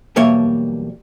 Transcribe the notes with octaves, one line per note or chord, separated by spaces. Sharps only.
B1 E2 G3 A#3 C#5 E5